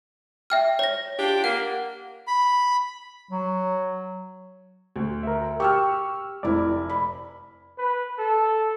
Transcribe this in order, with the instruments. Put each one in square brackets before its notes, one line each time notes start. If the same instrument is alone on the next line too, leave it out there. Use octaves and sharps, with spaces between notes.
[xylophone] E5 G5 F6
C#5 A#6
[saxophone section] D4 F4 G4
[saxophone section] A#3 [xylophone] F#5
[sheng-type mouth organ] B5
[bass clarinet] F#3
[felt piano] D2
[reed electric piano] A#4 E5
[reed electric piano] G4 [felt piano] C#6 E6 F6
[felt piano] F1 E4 [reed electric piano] D5
[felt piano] B5
[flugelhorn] B4
A4